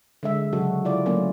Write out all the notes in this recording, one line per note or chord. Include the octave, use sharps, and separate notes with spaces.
D3 G#3 E5
C#3 F#3 F#4 A4
E4 F4 D5
F#3 A3 A#3 C#4